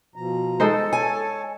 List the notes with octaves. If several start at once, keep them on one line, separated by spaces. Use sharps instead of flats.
B2 F3 A#5
G#3 D#4 A4 C5
C#5 G#5 A5